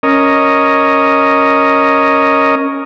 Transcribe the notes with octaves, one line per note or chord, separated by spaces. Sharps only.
C#4 A#4 D#5